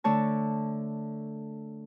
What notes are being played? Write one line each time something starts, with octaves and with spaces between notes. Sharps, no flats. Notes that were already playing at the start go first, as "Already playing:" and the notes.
D3 A3 C#5 A5